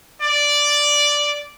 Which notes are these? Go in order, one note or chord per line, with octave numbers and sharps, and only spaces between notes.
D5